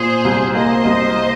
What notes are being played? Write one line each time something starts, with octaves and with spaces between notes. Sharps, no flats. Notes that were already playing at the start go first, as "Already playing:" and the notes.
Already playing: A#2 G#4 C5
C2
A#3 C5 D#5
C2
A#3